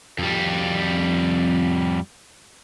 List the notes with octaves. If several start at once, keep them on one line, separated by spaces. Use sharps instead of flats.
F2 G3